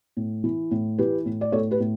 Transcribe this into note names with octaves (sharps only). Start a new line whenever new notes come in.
A2
E3
A2
E3 G4 B4
A2
D5
A2 A4 C#5
G4 B4
A2